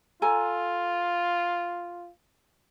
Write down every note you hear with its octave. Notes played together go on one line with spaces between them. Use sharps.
F4 A4 G#5 A#5